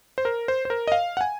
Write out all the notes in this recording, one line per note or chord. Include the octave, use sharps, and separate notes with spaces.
C5
A#4
C5
C5
A#4
D#5
F5
F#5
G#5